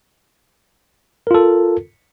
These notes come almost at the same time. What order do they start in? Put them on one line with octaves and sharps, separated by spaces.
A#4 F4 A4